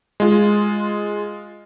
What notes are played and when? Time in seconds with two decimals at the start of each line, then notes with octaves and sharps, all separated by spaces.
0.20 G#3 F4